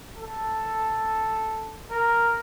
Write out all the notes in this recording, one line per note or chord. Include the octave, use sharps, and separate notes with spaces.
A4
A#4